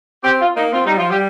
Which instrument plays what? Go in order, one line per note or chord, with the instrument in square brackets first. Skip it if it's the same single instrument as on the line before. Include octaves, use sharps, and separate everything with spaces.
[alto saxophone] C4 [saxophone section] G4
[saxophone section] F4
[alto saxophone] A#3 [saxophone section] D#4
[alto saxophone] C4 [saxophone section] F4
[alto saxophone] G3 [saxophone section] D#4
[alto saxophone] F3 [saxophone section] F4
[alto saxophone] G3 [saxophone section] G4